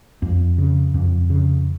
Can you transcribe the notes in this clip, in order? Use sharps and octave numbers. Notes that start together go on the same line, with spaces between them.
F2
C#3
F2
C#3